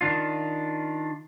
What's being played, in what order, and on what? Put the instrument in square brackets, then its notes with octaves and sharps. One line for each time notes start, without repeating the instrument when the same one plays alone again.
[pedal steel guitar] D#3 D4 F4